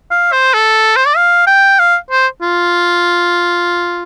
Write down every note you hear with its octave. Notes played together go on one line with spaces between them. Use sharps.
F5
C5
A4
C5
D5
F5
G5
F5
C5
F4